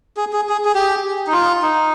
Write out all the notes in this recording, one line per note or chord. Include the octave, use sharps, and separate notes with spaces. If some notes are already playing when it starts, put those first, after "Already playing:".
G#4
G#4
G#4
G#4
G4
D#4
F4
D#4